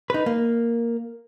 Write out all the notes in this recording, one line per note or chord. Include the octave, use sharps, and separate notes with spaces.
D#4 B4
A#3